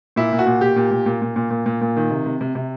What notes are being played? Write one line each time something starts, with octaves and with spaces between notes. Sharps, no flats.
A#2 E4
A#2
F#4
A#2
A#2 G4
A#2
A#2
A#2
A#2
A#2
A#2
A#2
A#2
D#3
C3
C3
C3
C3